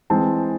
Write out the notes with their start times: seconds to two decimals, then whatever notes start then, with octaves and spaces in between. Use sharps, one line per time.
0.10 E3 G#3 C4 A5